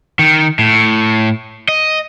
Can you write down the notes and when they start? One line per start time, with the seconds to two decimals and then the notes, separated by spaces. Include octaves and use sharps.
0.19 D#3
0.59 A2
1.68 D#5